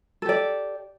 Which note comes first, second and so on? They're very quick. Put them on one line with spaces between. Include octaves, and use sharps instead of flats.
A4 G4 D5